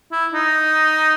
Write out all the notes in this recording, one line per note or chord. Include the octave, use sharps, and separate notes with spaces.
E4
D#4